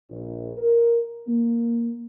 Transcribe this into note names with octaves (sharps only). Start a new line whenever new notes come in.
A#1
A#4
A#3